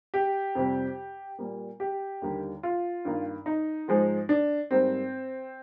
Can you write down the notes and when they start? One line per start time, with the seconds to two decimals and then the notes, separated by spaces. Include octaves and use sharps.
0.14 G4
0.55 F2 C3 G3
1.39 A#2 G3 A#3
1.80 G4
2.22 D#2 D3 G3 A#3
2.63 F4
3.05 G2 D#3 A#3
3.46 D#4
3.88 G#2 F3 G#3
4.29 D4
4.71 G#2 G3 A#3 C4